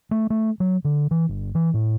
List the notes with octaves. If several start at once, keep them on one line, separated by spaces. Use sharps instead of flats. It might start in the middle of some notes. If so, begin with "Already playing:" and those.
A3
A3
F#3
D3
E3
G1
E3
A2